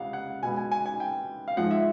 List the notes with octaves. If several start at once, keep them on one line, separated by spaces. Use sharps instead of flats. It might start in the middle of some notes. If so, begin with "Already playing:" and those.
Already playing: C#2 C3 F5 F#5
F#5
B2 G#3 B3 G#5
G#5
G#5
G#5
G5
F5
G#2 F3 G#3 F#5
E5